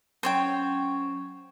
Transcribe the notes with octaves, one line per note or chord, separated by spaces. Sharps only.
F#3 C#4 C5 C#5 G5 C#6